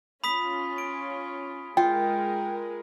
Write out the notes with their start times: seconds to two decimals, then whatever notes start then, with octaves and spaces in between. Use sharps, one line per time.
0.24 C#4 F4 B5 D#6 B6
0.78 D7
1.77 G#3 F4 A#4 G5